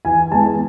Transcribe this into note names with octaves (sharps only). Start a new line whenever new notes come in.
E3 G#5
G#3 B3 A5